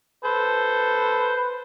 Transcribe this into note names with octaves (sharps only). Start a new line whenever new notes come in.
A4 B4 C5